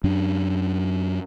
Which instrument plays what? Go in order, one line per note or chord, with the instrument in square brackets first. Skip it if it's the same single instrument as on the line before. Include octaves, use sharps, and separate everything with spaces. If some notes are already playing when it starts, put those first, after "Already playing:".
[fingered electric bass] F#2 F#3 C#4 D4